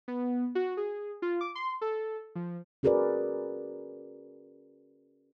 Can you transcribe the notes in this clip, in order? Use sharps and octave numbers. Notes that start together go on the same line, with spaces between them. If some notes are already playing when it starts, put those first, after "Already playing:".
B3
F#4
G#4
F4
D6
C6
A4
F3
C#4 F#4 G#4 A#4 B4 D5